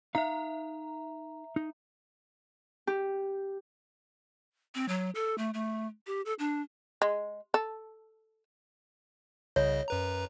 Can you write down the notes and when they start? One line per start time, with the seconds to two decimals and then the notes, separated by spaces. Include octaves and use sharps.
0.15 D#4 E5 F5 A#5
1.56 D#4
2.87 G4
4.75 C4
4.88 F#3
5.15 A4
5.38 A3
5.54 A3
6.07 G4
6.26 A4
6.39 D4
7.02 G#3
7.54 A4
9.56 C2 C#3 C#5 D#5
9.88 F#2 B4 A#5